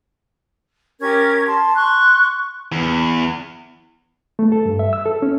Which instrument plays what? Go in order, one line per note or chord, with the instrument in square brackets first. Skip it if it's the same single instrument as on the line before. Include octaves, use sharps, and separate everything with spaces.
[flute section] C#4 G4 A#4 G#6
A5 C6
C6 C#6 F#6
[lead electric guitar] E2
[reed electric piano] A3
A4
G2
E5
E6
A4
C#4